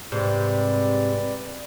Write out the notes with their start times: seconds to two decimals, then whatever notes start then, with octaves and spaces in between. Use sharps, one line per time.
0.12 G#2 C3 G3 B4 D5